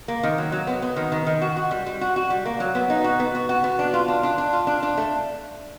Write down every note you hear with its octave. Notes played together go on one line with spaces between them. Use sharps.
A#3
D#3
F#3
F#3
B3
B3
D#3
D#3
D#3
F#4
F#4
G3
G3
F#4
F#4
G3
A#3
F#3
B3
D#4
F#4
B3
F#4
F#4
B3
D4
F4
D4
D4
D4
F4
D4
D4
A3